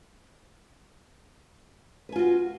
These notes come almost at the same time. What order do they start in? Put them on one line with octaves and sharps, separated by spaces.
B4 G#5 F4 F#4